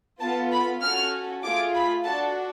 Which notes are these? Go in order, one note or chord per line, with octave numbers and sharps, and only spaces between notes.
B3 F4 A4 A5
B5
C#4 F#4 A4 F6
A3 F4 G#4 D6
B5
D4 F#4 A4 A5